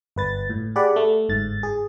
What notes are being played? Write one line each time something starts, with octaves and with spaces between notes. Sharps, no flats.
G1 B4 A6
A2
G4 G#4 D5 F#5 B5
A3
G1 G#2 A6
G#4